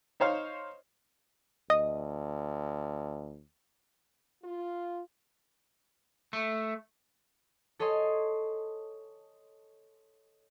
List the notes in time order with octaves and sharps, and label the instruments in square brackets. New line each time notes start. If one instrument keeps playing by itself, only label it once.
[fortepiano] D#4 C5 C#5 F5
[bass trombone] D2 [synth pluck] D#5
[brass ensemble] F4
[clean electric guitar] A3
[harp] A4 C#5 D#5 G#5 C6